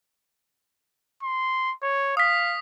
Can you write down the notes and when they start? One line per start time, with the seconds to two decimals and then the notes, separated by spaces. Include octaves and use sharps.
1.23 C6
1.83 C#5
2.17 F5 D#6 B6